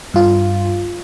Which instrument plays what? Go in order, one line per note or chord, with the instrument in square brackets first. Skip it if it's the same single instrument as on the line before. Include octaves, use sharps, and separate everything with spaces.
[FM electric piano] G2 F4